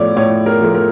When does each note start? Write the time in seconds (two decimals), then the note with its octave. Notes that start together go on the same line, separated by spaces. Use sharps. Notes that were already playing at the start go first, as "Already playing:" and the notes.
Already playing: A2 F3 A3 C#5 D5
0.16 A2 C#5
0.46 A#4
0.61 F3 A3
0.75 A#4